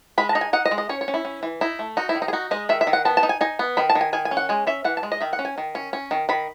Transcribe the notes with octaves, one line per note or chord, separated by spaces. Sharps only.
G#3 B5
A5
D#4
G#5
D#4 F#5
D#5
G#3
D#5
C#4 C#5
C#5
C#4
E4
C#4
E3
D#4 E4
A3
D#4 F#4
E4
D#3
D#4
G#4
D#4 F#4
G#3 D#5
D#3 E5
E5
D#3
F#5
B3 A5
A5
D#4
G#5
D#4 G#5
B3
D#3 B5
A5
D#3
G#5
D#3 G#5
G#5
C#4
F#5
G#3 G#5
C#4 E5
E3 F#5
A5
G#3
D#5
D#3 E5
F#5
C#4
G#5
D#3
C#4
C#4
D#3
D#3 B5